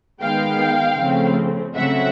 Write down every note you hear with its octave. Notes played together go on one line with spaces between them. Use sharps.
D#3 G#3 B3 F5 G5
C#3 F3 A3 C4
C#3 F#3 A3 C4 E5 F#5